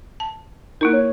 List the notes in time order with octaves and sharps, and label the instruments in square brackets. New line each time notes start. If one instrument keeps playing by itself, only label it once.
[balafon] A5
[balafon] A#3 E4 A#4 [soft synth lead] D#4
[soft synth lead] C#5